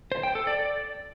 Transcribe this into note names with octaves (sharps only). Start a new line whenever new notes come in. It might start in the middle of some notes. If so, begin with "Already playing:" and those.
C5
G5
A4
D5